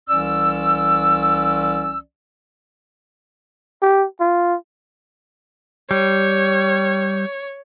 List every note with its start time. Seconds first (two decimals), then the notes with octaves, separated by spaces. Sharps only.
0.08 C2 E3 C#4 D5 E6
3.82 G4
4.20 F4
5.91 G3 C#5